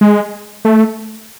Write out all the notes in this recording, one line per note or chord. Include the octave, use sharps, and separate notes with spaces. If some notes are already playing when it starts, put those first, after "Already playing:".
G#3
A3